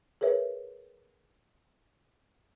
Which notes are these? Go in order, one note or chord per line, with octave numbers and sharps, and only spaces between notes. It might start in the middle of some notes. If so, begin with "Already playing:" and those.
G#4 A#4 B4 C#5 E5